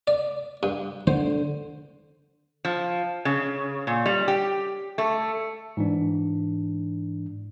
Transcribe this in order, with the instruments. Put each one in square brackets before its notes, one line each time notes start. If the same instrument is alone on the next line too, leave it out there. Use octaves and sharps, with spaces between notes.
[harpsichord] D5
G2
[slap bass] D3 [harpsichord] C5
[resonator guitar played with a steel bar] F3
C#3
A#2
G3
G4
A3
[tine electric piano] G#2 E3 D4